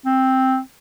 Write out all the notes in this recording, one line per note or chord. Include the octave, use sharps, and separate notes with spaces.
C4